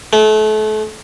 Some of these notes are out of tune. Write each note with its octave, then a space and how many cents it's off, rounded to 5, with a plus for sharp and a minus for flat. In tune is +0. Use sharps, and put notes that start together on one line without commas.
A3 -35